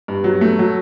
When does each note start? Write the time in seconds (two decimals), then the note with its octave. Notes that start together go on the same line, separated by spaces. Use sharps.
0.08 G2
0.24 F#3
0.41 A3
0.59 F#3